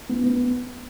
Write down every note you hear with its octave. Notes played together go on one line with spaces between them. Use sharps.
B3
B3